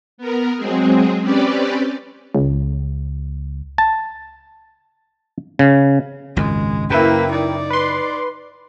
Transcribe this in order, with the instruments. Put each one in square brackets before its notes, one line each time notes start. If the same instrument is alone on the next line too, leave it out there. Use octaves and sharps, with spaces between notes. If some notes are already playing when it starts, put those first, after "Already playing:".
[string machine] B3 A#4
F#3 G#3 C4 G#4
C4 C#4 G4 B4 D5
[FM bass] C#2
[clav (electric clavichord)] A5
C#3
[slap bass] G#1 C#2 F#2 [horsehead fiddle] G#3
[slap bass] F#2 C#3 [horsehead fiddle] A#3 B4 [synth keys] E4 A#4 G5
[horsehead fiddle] D#4 D5
[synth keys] B4 C6